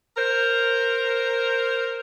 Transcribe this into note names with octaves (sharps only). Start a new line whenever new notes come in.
A#4 C5